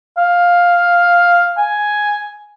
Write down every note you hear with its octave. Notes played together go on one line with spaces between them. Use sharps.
F5
G#5